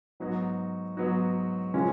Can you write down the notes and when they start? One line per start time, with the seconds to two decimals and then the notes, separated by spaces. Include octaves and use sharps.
0.20 G#2 F#3 B3 D#4 F#4
0.97 G#2 F#3 B3 D#4 F#4
1.74 C#3 F3 G#3 C#4